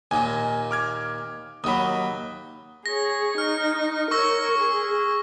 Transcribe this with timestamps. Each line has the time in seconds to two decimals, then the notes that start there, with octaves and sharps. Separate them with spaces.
0.11 D#2 A#2 G#5
0.71 D6 F6 G#6
1.64 D#2 F#3 B5 D#6
2.86 G#4 C#5 A#6
3.38 D#4 F6
4.11 A#4 C#5 C#6 E6 A#6
4.58 G#4